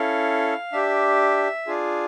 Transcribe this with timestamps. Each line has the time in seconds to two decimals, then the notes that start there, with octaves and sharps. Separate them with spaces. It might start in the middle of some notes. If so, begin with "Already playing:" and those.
Already playing: C#4 E4 A4 F5
0.73 D4 G4 E5
1.67 D4 F4 G#4